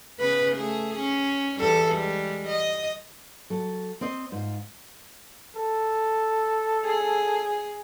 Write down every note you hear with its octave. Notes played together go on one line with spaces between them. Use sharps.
C#3 B3 B4
A3 G#4
C#4
E2 G3 A4
G3 G#3
D#5
F#3 A4
C4 C5 D#5
G#2 F4
A4
G#4